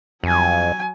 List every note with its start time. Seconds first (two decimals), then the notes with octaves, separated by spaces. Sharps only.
0.24 F2 F#3 G#5